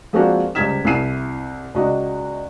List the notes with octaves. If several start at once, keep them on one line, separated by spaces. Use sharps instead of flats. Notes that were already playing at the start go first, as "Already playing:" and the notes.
F3 G#3 A#3 C4 D4 F#4
C#2 G3 C5 G#6 B6 E7
C2 E4 G#5 C7 D#7
C#2 D4 F#4 D#5